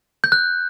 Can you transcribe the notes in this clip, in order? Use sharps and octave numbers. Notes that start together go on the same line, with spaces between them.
G6
F#6